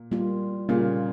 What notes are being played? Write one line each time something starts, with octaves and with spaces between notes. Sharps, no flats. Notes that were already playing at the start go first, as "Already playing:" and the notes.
Already playing: A#2
G3 A#3 F4
A#2 C#3 G3 A#3 F4